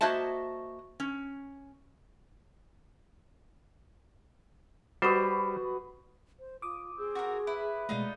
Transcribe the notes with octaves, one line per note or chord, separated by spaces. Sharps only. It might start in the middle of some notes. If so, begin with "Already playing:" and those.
A#3 F#4 C5 D#5 E5 A5
C#4
G3 F#4 B4 C5 D#5
C5
F4 D6 D#6
C4 G#4
F#4 A#4
E4 B4
B2 G#3 A3 D#4 F4 D5 D#5